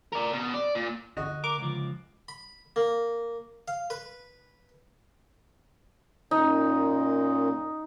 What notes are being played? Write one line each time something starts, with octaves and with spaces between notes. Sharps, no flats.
A#4 D5
B2
D5
A#2
F2 D3 F#4 D#5
A#4 D6
C#2 F3
B5
A#3
F5
B4
F#2 A#2 D#4